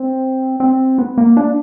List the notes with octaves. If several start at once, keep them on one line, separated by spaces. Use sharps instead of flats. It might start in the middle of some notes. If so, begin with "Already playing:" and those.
Already playing: C4
C4
B3
A#3
D4